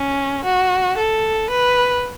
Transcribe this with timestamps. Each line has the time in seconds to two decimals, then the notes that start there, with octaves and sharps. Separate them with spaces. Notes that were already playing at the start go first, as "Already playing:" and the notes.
Already playing: C#4
0.44 F#4
0.97 A4
1.50 B4